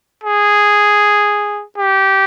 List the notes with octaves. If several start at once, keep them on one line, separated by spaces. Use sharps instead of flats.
G#4
G4